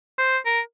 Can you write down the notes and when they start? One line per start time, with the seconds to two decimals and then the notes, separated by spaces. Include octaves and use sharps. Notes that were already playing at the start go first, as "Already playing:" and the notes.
0.18 C5
0.46 A#4